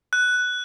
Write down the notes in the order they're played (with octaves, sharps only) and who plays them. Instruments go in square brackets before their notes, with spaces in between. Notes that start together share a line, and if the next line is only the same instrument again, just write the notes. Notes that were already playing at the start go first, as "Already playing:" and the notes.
[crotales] F#6